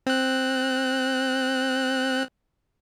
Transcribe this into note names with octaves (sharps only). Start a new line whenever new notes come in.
C4 F#6